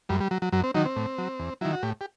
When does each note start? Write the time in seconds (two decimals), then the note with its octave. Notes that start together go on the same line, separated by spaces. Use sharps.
0.09 F#2 G3
0.20 G3
0.31 F#3
0.42 F#3
0.52 F#2 F#3
0.64 C4
0.74 D#3 F#3 D#4
0.85 C4
0.96 A2
1.18 F#3
1.39 E2
1.61 D#3 F#3 E4
1.73 F#4
1.83 A2 G4
2.01 G4